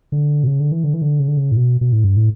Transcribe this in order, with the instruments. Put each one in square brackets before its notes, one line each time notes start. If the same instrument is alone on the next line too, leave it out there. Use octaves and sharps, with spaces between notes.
[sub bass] D3
B2
C#3
D3
E3
D3
E3
D3
C#3
D3
C#3
A2
B2
B2
A2
G2
A2